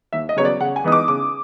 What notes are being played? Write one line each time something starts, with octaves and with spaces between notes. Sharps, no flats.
D#2 E5
D#5
C#3 F#3 B3 C#5
D5
C#3 F#5
G#5
E3 G#3 B3 D#4 D#6
D6
C#3 D6